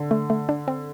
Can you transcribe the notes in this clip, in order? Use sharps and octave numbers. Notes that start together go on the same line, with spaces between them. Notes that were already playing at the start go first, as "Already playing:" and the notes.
Already playing: D3
A3
A3
D4
C4